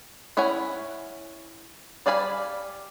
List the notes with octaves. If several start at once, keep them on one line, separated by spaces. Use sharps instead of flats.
C#4 E4 C#5 F#5 G#5
G3 D5 F5 G#5 B5